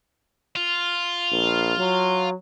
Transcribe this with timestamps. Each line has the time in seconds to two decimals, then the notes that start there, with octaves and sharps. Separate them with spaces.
0.56 F4
1.31 A#1
1.78 F#3